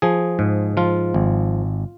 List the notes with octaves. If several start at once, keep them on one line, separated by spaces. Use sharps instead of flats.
F3 G#4
G#2
F3 F4
G#1